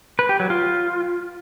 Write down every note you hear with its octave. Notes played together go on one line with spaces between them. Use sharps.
B4
G4
F#3
F4